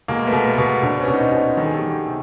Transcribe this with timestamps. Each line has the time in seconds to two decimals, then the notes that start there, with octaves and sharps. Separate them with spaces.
0.08 B2 G#3 A#3
0.27 A3 B3
0.33 B2
0.45 A3 B3
0.58 B2
0.83 B2 C4 D4
1.01 B3 C#4
1.08 B2
1.13 D#4
1.20 C4 D4
1.32 B2
1.57 D#3 A4
1.66 G#4
1.74 G4 A4
1.82 D#3
2.07 C3